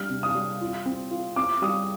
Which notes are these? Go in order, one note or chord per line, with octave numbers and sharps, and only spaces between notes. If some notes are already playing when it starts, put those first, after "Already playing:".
Already playing: G3 D4 F6
C3
D#6
G3
F4
C4
F4
C4 D6
G3 D#6